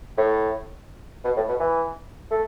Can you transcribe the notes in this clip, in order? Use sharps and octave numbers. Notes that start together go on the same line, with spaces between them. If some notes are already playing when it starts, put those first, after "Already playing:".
A2
B2
A2
B2
E3
A3